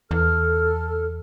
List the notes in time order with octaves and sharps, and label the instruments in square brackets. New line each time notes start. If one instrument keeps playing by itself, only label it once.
[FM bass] E2 [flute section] A4 F6